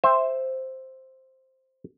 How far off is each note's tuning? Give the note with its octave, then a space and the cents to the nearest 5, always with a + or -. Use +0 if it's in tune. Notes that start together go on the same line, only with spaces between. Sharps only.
C5 +0 E5 +0 G5 +30